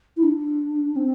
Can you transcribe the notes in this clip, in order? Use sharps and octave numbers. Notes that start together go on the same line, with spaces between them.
E4
D4
C4